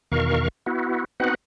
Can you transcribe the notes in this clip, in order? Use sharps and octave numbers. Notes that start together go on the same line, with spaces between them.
E2 B2 D#3 A#4 F5 C#6
B3 E4 F#4
B3 C4 D#4 F#4 B4 F#5